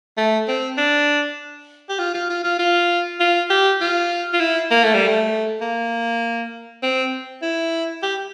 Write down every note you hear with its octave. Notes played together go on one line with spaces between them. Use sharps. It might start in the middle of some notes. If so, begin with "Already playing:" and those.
A3
C4
D4
G4
F4
F4
F4
F4
F4
F4
G4
F4
F4
E4
A#3
A3
G3
A3
A#3
C4
E4
G4